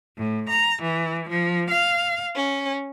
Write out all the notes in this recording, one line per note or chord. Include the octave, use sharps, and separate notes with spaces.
A2
A#5
E3
F3
F5
C#4